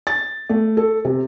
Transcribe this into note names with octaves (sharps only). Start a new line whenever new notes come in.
A6
A3
A4
C3